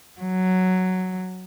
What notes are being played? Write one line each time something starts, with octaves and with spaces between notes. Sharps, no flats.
F#3